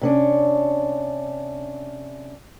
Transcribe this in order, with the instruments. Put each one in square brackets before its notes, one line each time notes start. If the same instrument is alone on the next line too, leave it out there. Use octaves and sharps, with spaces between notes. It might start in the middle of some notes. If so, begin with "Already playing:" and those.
[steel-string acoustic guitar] C3 C#4 D4